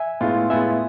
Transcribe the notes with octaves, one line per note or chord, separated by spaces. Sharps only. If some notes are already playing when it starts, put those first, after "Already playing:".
Already playing: E5 G#5
A2 G#3 B3 F4
A2 G#3 B3 F4 E5 G#5